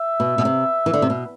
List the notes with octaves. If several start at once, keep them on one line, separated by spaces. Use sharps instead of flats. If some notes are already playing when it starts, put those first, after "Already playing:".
Already playing: E5
B2
B2
C3
E3
D3
C3
B2